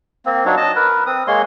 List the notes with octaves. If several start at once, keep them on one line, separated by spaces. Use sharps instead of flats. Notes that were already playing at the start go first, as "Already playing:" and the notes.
A#3 C4
F#3 D4 D#4 C#5
D#5 A5
A#4 B4
C4 D#6
G#3 A#3 C#5 C6